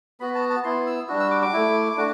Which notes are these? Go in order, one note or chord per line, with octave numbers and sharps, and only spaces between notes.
B3 F#4 B5
A5
A5
B3 E4 C6
E6
G3 D4 F#4
E6
D6
D6
A3 E4
A3 D4 F#4